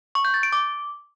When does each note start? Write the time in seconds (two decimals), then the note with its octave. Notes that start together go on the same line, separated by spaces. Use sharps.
0.15 C#6
0.25 G6
0.34 A6
0.43 D7
0.53 D6